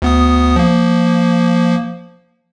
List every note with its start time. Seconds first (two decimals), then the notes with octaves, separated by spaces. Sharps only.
0.02 D2 B3 D#6
0.56 F3 A#3